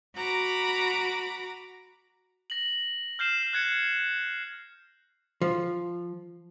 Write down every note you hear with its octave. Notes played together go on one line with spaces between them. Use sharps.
F#4 A#5 B5 D6
A#6 F#7
F6 G6 C7 E7
F#6 G#6 C#7
F3